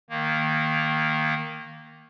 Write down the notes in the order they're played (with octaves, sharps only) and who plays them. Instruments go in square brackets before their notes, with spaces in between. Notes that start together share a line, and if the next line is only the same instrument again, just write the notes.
[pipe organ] D#3 A#3